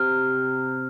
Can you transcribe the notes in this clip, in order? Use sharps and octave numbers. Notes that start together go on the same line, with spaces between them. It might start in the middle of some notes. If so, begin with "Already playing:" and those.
Already playing: C3 F6